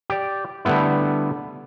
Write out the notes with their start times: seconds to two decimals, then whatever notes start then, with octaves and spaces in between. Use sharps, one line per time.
0.10 G4 D5
0.65 D3 G3 A3 B3 E4